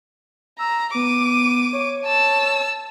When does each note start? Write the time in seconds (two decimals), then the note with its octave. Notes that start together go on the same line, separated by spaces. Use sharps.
0.59 A#5 E6
0.94 B3 D6 D#7
1.73 C#5
2.05 A5 E6